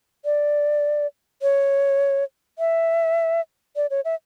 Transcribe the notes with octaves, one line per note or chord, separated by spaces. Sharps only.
D5
C#5
E5
D5
C#5
E5